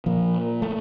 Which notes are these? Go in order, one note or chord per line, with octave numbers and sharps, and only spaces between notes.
A#2 F3
A3